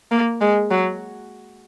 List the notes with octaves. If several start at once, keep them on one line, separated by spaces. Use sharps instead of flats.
A#3
G#3
F#3